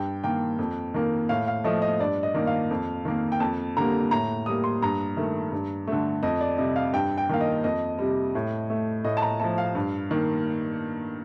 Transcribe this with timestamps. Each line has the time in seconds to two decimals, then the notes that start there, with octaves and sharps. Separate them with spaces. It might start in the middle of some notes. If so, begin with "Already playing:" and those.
Already playing: G2 G5
0.24 D#3 A#3 G5
0.59 F2
0.94 D#3 A#3
1.29 A2 F5
1.47 F5
1.64 F3 A3 D#5
1.82 D#5
2.00 G2 D5
2.23 D#5
2.34 D#3 A#3
2.47 F5
2.71 F2
3.05 D#3 A#3
3.32 G5
3.40 F2 A5
3.77 D3 G3 A#3 A#5
4.11 A2 A#5
4.46 G3 A#3 D#6
4.64 C6
4.82 G2 A#5
5.17 D#3 A3
5.52 G2
5.88 D3 A3
6.23 F2 D#5
6.41 D5
6.58 C3 G3 D#5
6.76 F5
6.93 G2 G5
7.18 G5
7.29 D#3 A#3 F5
7.41 D#5
7.64 F2 D#5
7.99 C3 G3
8.35 A2
8.70 A3
9.04 A2 D#5
9.17 A5
9.22 A#5
9.40 F3 A3 A5
9.58 F5
9.75 G2
10.10 D#3 A#3